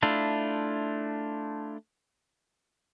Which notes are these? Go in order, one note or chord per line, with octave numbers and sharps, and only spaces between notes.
A3 D4 E4 F4